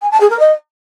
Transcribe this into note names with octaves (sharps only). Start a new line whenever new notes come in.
G#5
A5
G#4
A#4
D#5